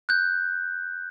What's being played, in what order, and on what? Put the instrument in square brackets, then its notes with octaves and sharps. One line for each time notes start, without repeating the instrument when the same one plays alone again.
[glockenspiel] F#6 G6